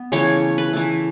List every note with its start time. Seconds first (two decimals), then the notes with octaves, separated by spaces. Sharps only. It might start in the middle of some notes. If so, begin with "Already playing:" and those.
Already playing: B3
0.12 C#3 E3 A3 C#5
0.58 B4
0.73 E3 A3